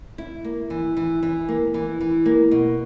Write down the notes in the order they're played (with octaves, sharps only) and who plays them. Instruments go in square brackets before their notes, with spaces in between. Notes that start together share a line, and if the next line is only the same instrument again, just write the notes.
[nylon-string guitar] E4
A#3
E3
E3
E3
A#3
E3
E3
A#3
B2